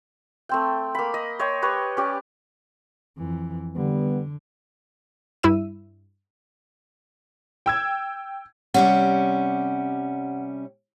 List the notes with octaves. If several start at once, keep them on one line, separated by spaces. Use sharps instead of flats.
A3 C4 G5
A#3 B5
D#5
C#5 D#5 G5 C6
G4 B4 C#5 C#6
C#4 G4 D5
F2 E3
D3 G3 B3
G2 E4 E5 E6 D#7
G5 E6 G#6
C3 G3 C#4 F#5